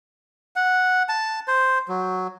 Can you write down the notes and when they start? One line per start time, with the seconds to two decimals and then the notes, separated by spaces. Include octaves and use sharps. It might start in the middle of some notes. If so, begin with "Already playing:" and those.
0.56 F#5
1.09 A5
1.48 C5
1.88 F#3